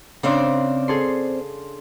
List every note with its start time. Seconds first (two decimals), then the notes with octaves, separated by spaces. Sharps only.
0.23 C#3 C4 D4 C5 D5
0.88 G#4 A4 C6